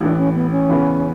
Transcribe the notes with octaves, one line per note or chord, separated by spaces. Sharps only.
A1 A2 E3 D4
C#4
B3
C#4
E2 C#3 E3 B3